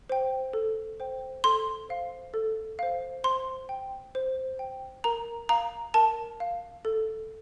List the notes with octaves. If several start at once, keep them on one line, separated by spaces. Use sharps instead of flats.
C5 G5
A4
C5 G5
A4 C6
C5 F5
A4
C5 F5
C5 C6
G5
C5
G5
A#4 A#5
F5 A#5
A#4 A5
F5
A4